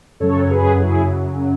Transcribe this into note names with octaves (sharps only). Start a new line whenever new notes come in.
F#2 C#3 F#3 A4 C#5
C#5
G#4 B4
E4 G#4